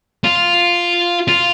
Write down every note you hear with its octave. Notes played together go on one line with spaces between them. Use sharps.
F4
F4